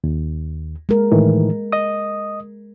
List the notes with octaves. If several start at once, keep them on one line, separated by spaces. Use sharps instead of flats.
D#2
G#3 A#4
A2 D#3 E3
D#5 D#6